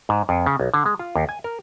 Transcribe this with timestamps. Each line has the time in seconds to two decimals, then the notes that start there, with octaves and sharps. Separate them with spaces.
0.09 G#2
0.29 F2
0.46 C#3
0.60 B1
0.74 D3
0.86 G#3
0.99 F4
1.16 D#2
1.29 G#5
1.44 A#4